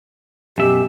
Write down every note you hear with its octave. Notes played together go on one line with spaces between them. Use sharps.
F#2 B2 G4 E5